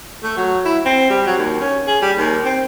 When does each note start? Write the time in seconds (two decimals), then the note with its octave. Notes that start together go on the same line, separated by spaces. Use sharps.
0.23 A3
0.37 F#3
0.65 E4
0.85 C4
1.10 G3
1.26 F#3
1.37 D#2
1.60 C#4
1.87 G#4
2.02 G3
2.16 D#2
2.44 C4